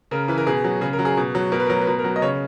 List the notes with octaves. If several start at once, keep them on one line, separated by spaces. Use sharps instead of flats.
C#3 A#4
E3 B4
A#4
B2 G#4
F#3
C#3 G#4
A#4
F#3
G#4
B2
F#3
B2 A#4
B4
A#4
F#3
B4
B2 A#4
A#4
F#3
D#5
C#3 C#5